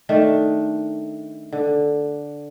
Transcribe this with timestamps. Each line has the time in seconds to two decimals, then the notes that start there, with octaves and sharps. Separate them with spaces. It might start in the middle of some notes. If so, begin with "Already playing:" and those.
0.09 D#3 A3 D4
1.53 D3